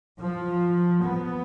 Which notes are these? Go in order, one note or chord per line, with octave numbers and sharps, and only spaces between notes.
F3
B3